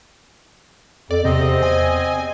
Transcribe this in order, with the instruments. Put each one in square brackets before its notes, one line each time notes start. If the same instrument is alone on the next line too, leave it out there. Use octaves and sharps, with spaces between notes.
[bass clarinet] F2 [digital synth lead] D5
[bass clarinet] E2 [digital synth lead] C3 [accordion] C4 D#5
[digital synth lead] G#5